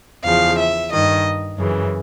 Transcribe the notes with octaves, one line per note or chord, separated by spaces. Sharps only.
E2 C#3 F3 F5
E5
G2 D#3 D#5
F#2 C#3 E3